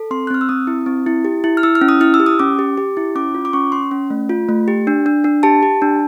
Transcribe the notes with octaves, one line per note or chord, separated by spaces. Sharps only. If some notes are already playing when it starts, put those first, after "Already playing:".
Already playing: A4
C4 C6
F#6
C4 F6
E6
C4 D#6
E4
C4
E4
G4
E4
F6
E4 E6
F6
C#4
D#6
E4 F6
E6
G4
D#6
C#4 D6
G4
G4
E4
C#4 D6
F4
D6
C#4 C#6
C#4 C6
C#4
A3
F4
A3
G4
D4
D4
D4
G4 A5
G4
D4